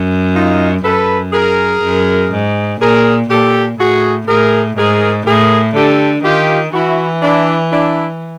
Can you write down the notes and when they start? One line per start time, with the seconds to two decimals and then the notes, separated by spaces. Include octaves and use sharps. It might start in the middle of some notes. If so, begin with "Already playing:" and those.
Already playing: F#2
0.35 D#4 F4
0.84 F#2 A4 B4
1.33 G#4 A#4
1.82 F#2
2.31 G#2
2.80 A#2 G#4 A#4
3.30 A#2 G4 A4
3.79 A2 F#4 G#4
4.28 A2 G#4 A#4
4.77 G#2 G#4 A#4
5.26 A2 G#4 A#4
5.75 D3 G4 A4
6.24 D#3 F4 G4
6.73 E3 E4 F#4
7.22 D4 E4
7.72 D4 E4